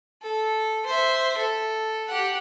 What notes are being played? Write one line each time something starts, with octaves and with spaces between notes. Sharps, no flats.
A4
C5 E5
A4
G4 F#5